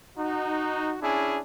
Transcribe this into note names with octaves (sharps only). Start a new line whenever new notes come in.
D#4 F#4
C#4 D4 E4 G#4